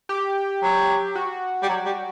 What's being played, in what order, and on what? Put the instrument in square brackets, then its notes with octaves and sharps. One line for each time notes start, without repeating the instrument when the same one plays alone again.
[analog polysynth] G4
[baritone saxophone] F#3
[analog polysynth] F#4
[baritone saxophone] G3
F#3
G3